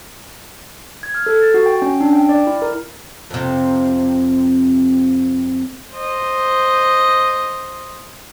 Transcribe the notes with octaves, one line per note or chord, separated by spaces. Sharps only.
G#6
F6
A4
A6
F#4
G5
C#4
D4
G5
D5
E4
A#4
F2 C3
C5 D#5